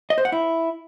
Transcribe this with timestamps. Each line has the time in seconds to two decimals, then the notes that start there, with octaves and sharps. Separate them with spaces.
0.10 D#5
0.18 C5
0.25 F#5
0.32 E4